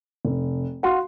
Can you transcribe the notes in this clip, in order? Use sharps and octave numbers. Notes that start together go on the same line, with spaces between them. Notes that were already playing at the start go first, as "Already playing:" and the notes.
F1
F#4 F5 C6